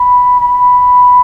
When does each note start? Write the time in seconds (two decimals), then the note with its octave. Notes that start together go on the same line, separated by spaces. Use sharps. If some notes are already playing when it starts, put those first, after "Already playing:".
Already playing: B5
0.40 B5